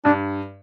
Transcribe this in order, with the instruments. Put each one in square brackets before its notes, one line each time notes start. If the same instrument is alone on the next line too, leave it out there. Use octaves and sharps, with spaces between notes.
[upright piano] G2 [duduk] D4